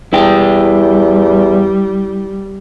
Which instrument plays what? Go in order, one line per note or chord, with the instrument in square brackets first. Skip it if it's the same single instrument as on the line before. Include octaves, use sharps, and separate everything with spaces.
[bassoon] E2 [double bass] G3 [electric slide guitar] E4 G5